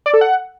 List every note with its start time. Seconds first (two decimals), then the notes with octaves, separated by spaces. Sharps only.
0.06 D5
0.14 A4
0.21 F#5